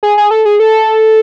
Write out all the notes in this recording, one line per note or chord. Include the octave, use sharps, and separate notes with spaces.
G#4
G#4
A4
G#4
A4